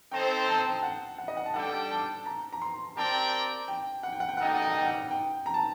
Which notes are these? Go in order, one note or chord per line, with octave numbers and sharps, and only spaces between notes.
C4 D#4 A4 C5 G5
A5
G5
F#5
F#5
D#5
F#5
A5
G3 D4 A4 D5 F#5 G5
A5
A#5
A#5
C6
C4 G4 A#4 D5 G5 A5
G5
F#5
G5
F#5
G5
G3 A#3 D#4 A4 D#5 F#5
G5
F#5
G5
F#5
G5
F#5
G5
A#5
A5